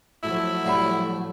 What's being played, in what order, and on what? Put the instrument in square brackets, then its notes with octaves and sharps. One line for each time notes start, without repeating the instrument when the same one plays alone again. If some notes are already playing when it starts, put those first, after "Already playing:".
[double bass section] F3 F#3 A3 [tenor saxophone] E4
[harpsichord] A2 G3 [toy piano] E5 F#5 B5